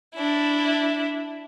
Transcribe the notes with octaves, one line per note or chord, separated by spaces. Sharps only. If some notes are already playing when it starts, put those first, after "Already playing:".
D4 E4